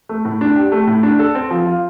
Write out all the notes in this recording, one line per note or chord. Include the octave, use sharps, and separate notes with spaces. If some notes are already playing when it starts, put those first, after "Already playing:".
A3
A2
D4
G4
A3
A2
D4
A4
C4
F3
F4